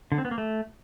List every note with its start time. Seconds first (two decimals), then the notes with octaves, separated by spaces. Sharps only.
0.12 D3
0.18 C4
0.25 B3
0.31 A#3
0.38 A3